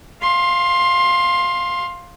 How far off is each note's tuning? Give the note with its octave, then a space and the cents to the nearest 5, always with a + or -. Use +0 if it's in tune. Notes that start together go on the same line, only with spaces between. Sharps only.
F5 +0 C6 +15